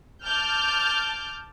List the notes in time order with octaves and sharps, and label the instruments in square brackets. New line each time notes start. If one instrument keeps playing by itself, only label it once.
[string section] A5 D6 F6 G6